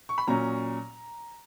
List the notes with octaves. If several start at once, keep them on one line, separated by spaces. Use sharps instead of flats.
C#6
B5
A#2 F#3 C#4 A#5